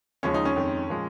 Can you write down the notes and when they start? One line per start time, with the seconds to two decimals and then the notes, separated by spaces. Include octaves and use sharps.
0.23 D#2 C#3 F3 G#3 C#4
0.34 D#4
0.45 C#4
0.56 F2 D#3 G#3
0.89 A#2 F3 G#3